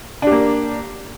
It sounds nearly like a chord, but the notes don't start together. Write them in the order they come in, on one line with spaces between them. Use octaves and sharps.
D4 G4 A#3